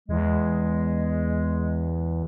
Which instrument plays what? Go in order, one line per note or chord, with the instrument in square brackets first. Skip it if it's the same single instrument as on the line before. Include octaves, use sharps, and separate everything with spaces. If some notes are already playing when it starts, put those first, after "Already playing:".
[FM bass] E2 [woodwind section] G#3